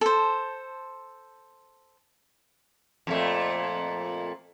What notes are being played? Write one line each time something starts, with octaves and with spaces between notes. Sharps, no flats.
A4 C5
F2 A#2 A3